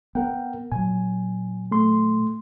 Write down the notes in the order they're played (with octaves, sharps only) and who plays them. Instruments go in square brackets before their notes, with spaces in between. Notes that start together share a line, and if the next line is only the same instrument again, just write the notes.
[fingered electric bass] B3 [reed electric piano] A#4 F#5 G5
[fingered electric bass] A#2 F#3 [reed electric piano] G#5
[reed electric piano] A3 C6